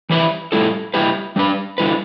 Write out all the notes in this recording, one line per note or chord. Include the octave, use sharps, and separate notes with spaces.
E3 G3 E4 B4
A2 G3 E4 A4
G3 E4 G4 B4
G3 D4 B4
D3 G3 E4 B4